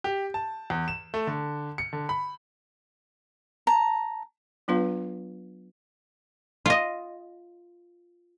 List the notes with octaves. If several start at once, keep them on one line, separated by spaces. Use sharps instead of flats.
G4
A5
E2
E7
A3
D3
C#7
D3
B5
A5 A#5
F#3 B3 D4 F4 B4 F5
F4 D#5